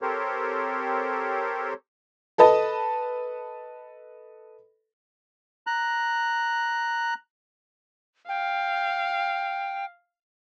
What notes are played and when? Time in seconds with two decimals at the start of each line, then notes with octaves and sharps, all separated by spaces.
0.02 C4 G4 A4 A#4 C5 C#5
2.38 A4 B4 D#5 A5
5.67 A#5 F#6
8.29 F5 G5